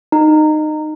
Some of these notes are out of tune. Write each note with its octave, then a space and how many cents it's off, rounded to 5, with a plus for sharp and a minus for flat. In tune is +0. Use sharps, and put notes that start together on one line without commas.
D#4 -20